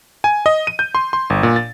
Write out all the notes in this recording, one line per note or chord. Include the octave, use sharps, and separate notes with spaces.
G#5
D#5
D#7
G6
C6
C6
G1
A#2
A6